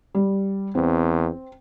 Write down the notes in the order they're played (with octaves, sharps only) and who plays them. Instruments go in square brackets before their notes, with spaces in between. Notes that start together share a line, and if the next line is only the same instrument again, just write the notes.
[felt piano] G3
[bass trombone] E2 [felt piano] C4